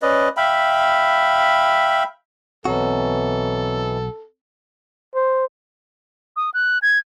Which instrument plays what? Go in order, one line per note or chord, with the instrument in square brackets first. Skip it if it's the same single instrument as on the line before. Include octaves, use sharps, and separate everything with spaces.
[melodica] C#4 B4 D5 D#5
E5 F5 G5 B5
[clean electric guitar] B1 F#4 [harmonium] B2 E3 [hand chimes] C4 C#5 A#5 [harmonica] A4
[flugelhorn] C5
[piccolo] D#6
F#6
G#6